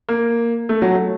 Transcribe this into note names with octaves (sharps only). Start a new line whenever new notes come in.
A#3
A3
F#3
A3